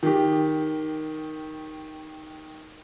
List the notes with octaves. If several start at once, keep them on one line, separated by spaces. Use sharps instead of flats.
D#3 G4